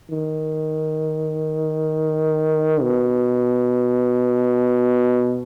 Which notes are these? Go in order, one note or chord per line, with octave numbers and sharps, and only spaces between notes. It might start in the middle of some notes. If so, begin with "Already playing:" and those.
D#3
B2